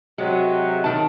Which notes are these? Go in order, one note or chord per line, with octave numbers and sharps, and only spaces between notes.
C3 F#3 G#3
D#3 A5